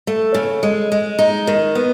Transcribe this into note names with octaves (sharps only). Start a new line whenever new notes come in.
A3
C#3
G#3
G#3
D#4
D#3
B3